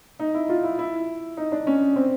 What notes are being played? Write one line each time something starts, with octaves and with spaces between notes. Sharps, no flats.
D#4
E4
F4
E4
E4
D#4
D4
C#4
C4